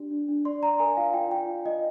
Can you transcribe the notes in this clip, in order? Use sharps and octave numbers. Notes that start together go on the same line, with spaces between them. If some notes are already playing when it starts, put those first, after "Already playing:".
Already playing: D4 G4 D5
D4
D4
D5 C6
D5 A#5
A#4 G#5
F4 F5
F4 G5
F4 G5
F4
F4 D#5